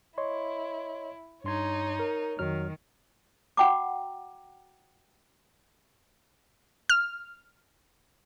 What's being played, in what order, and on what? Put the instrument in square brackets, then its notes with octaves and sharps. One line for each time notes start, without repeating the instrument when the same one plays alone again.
[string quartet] E4 [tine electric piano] C#5 D#5 C6
[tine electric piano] G2 C6 G#6 [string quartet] D#4 C#5
[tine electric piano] A#4
[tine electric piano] F2 F#3 F6 [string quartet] D#3
[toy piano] F#4 F#5 G5 A#5 D6
[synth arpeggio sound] F6